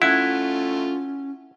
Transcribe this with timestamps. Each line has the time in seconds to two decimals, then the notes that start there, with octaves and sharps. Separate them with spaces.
0.02 A3 C#4 E4 F4 F#5 G#6